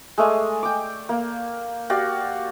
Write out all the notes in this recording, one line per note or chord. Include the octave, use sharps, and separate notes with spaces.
G#3 A3 D5 G#5
G5 D6
A#3
F#4 G4 D5 F5